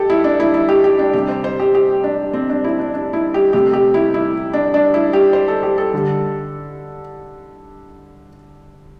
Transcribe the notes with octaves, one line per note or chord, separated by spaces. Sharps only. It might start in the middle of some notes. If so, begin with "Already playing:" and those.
Already playing: G4 A4
E4
D4
E4
E4
G4
G4
D4
C3 G3 G4
C5
C5
G4
G4
D4
C4
D4
E4
D4
D4
E4
G4
C3 A3 G4
G4
E4
E4
D4
D4
E4
G4
C5
A4
G4
A4
D3 G3